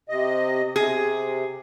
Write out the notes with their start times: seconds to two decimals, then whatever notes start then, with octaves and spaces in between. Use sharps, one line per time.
0.09 C3 D#5
0.76 C3 G#4